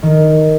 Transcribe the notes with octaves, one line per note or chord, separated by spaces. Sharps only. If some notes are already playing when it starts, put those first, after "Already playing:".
D#3